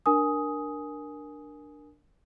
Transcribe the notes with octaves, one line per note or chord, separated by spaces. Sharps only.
D4 A#4 G#5 D#6